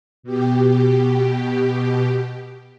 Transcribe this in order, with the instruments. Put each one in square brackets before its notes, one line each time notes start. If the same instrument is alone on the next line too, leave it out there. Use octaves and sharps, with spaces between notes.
[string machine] B2 G4